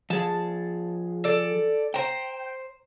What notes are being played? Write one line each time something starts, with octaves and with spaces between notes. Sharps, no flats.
F3 G#4 A5
A4 D5
C5 G5 A#5